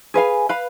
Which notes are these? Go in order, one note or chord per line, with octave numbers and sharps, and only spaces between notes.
G#4 B4 F5 G#5
B4 F5 B5